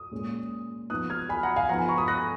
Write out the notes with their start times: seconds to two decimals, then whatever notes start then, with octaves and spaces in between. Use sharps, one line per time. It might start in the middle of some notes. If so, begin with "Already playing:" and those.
Already playing: D#6
0.11 A#2 G#3 C#4
0.90 F3 B3 D#4 D#6 F#6
1.10 F6 G#6
1.29 G#5 B5
1.43 F#5 A#5
1.56 F5 G#5
1.69 F3 B3 D#4 F#5 A#5
1.79 G#5 B5
1.89 A#5 C#6
1.98 B5 D#6
2.08 F#6 A#6